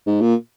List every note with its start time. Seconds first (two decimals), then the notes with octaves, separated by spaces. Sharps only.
0.06 G#2
0.21 A#2